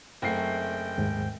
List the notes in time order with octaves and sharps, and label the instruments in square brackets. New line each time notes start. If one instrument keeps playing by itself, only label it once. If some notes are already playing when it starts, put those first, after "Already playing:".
[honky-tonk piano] F#1 C7 [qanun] A3 C4 [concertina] G5
[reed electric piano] D#2 G#2